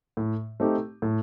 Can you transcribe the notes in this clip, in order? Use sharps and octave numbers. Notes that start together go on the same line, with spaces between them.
A2
A3 C4 D#4 G4
A2